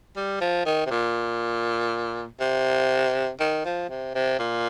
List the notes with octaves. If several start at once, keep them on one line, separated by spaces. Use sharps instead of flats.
G3
F3
D#3
C3
A#2
C3
D#3
F3
C3
C3
A#2